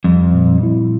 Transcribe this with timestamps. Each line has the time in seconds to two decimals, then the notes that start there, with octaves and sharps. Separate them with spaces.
0.04 F2 G3
0.34 A#2
0.63 E4